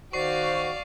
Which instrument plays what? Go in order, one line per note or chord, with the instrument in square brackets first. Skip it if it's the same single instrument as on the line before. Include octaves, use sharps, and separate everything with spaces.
[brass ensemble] D#3 F#4 [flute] C5 [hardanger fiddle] D5 F5 [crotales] C#6 C7